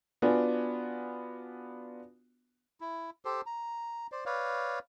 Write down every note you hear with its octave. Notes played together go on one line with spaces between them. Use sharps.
B3 D4 F4 F#4 D5 G#5
E4
G4 A4 C5
A#5
C5 D5
B4 C#5 D5 F5